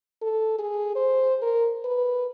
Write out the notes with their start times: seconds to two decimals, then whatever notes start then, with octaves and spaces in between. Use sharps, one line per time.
0.22 A4
0.59 G#4
0.96 C5
1.42 A#4
1.84 B4